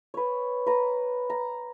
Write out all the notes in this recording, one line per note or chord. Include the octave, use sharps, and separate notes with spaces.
B4 C#5
B4 A#5
A#5